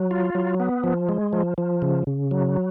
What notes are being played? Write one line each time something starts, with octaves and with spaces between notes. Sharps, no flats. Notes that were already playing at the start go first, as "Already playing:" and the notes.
Already playing: F#3
F4
F#3
B3
F3
G#3
F3
F3
C#3
C#3
F#3